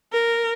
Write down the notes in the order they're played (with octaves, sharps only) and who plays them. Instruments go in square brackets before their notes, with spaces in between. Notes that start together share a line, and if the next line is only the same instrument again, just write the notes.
[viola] A#4